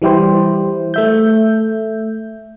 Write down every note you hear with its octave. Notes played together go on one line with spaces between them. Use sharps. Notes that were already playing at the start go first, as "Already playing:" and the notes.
E3 G3 E4 G4 C5
A3 E5 G6